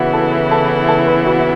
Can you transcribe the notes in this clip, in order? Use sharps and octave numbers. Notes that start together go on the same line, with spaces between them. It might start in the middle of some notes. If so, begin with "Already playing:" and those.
Already playing: C#3 E3 B3 E4 F#4 F#5
A4 A5
A4 A5
A4 A5
B4 B5
F#4 F#5